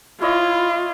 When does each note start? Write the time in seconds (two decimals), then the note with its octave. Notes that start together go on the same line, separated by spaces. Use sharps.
0.22 E4 F4 C#5 D#5